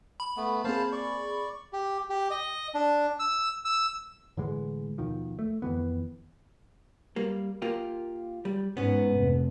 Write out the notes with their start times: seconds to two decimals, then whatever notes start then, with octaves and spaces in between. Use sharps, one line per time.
0.20 B5
0.37 A3 B3
0.64 A#3 C4 G#4 C5 F5 A5
0.92 D5 C#6
1.73 G4
2.10 G4
2.31 D#5
2.74 D4
3.19 E6
3.65 E6
4.37 A2 D3 E3 G#3
4.98 D#2 B2 D#3 F3
5.39 A3
5.62 F2 D#3 E3 B3
7.16 G3 A#3
7.62 A#3 F4 G4
8.45 G3
8.77 G#2 B3 C#4
9.16 F1